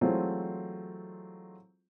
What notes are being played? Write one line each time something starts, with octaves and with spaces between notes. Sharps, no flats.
E3 F#3 G#3 A3 C4 F4